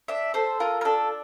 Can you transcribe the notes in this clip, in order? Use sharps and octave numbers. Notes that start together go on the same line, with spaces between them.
D4 E5
A4 C5
F4 A#4
A#4
D4 A4